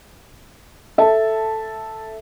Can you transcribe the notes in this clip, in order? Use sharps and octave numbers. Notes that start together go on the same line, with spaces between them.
A4 E5 A5